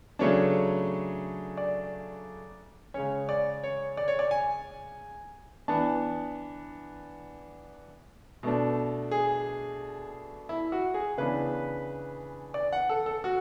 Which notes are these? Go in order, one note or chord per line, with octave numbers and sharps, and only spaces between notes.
C#3 F#3 A3 D4 C#5
D5
C#3 G#3 C#4 C#5
D5
C#5
D5
C#5
D5
G#5
E3 B3 D4 A5
B2 A3 D4
G#4
E4
F#4
G#4
C#3 E3 B3 D4 B4
D5
F#5
A4
A4
F#4